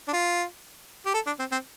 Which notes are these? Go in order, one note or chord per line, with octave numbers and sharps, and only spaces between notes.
D4
F4
G4
A4
D4
C4
C4